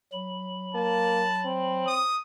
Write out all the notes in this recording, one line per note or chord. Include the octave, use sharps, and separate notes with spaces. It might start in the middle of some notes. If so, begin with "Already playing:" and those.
F#3 B5
A#3 A5
C4
D#6